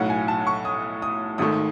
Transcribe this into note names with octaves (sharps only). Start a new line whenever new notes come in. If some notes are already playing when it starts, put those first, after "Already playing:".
Already playing: B1 A2 F#3 F#5
G#5
A5
C#6
D#6
D#6
G#1 G#2 D#3 A3 D#6